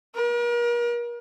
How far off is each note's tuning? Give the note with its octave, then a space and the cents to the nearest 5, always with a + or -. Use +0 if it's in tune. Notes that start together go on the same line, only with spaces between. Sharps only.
A#4 +40